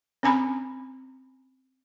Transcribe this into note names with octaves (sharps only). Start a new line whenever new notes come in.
C4 C#4 G#5 A#5 B5